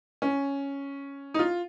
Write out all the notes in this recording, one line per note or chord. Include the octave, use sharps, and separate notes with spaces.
C#4
D#4
F4